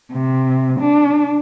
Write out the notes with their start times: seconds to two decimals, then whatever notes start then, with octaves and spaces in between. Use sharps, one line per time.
0.13 C3
0.79 D4